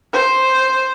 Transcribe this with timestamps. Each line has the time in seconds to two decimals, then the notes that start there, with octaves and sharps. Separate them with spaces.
0.13 C5